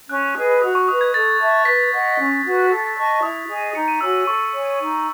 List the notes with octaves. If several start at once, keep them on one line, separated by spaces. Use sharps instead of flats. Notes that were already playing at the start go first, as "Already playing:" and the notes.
C#4 F#6
G#4 B4 D#5
F#4 D#6
C#6
B4 D#5 D#6
G#6
A4 A6
E5 A5 C#6
B4 B6
D#5 F#5
C#4
F#4 B4
A4
D#5 A5 C#6
E4 D#6
G#4 D#5 G#5
D#4 C#7
D#7
F#4 C#5 G#5 E6
A4 C#6
C#5 G#5
D#4